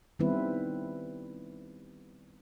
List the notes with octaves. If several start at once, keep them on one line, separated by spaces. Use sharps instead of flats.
D#3 G3 B3 C4 E4 B4